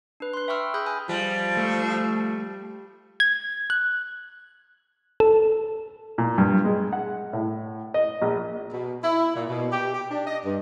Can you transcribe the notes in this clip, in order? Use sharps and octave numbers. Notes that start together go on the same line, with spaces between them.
D4 B4
C6 F#6
E5 G5 B5 C#6 E6 F6
G#4 B5 D#6 F#6 G6
G#5 D#6 F6 F#6
F3 G3
A3
G#6
F#6
A4
A#2
G2
G#3
F#5
A2
D#5
A#1
B2
E4
A#2
B2
G4
G4
D4
D#5
G2